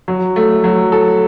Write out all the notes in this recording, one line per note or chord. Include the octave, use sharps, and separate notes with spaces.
F#3
A3
F#3
A4